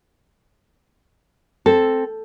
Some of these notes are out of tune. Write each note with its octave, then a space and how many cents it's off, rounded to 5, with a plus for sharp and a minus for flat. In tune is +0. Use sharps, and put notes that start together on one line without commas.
C4 +5 A4 +0